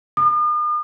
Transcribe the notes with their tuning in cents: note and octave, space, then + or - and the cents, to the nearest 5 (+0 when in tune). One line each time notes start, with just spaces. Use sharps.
D#6 -45